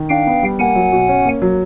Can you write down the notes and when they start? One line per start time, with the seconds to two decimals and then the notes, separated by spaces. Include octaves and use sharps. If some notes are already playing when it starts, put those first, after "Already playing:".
Already playing: D#3
0.10 D4 F5 G5
0.27 B3
0.43 G3
0.59 A#3 F#5 G#5
0.75 F#3
0.92 B2
1.08 C#4
1.25 A#3
1.42 F#3